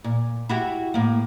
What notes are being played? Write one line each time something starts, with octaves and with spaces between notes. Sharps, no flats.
A#2
E4 F#4 G4
A2 A#3